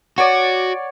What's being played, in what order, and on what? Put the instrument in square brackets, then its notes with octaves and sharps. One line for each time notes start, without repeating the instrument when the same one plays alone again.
[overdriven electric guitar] F#4 [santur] C#5 D5 [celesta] F#5